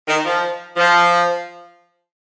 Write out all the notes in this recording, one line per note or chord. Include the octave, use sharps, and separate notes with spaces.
D#3
F3
F3